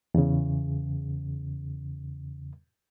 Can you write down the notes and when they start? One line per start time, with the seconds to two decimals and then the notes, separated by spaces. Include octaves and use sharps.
0.14 E2 C#3